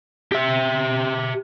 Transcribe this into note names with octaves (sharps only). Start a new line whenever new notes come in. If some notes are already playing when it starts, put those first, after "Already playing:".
G4 E5